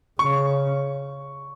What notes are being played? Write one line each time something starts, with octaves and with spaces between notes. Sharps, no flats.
C#3 C#6